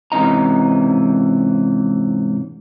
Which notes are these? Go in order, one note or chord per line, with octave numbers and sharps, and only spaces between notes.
G#2 C3 E3 C#4 D#5 A#5